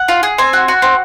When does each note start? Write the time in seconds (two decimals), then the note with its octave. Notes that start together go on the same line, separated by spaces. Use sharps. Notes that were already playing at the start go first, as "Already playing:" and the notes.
Already playing: F#5
0.08 F4
0.23 G#4
0.38 C4 G#5
0.53 F#4
0.68 F#4
0.82 C4